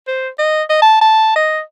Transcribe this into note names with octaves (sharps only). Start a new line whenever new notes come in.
C5
D#5
D#5
A5
A5
D#5